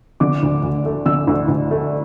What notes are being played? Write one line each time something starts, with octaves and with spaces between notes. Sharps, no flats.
D3 D6
D2
D2
A3
D3 E6
D2
D2
A3